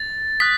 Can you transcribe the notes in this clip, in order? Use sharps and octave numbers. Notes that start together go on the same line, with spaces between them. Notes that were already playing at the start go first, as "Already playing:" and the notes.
Already playing: A6
D#6 F#6 B6